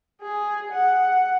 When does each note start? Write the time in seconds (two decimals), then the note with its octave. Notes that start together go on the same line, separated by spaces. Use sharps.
0.22 G#4
0.72 F#5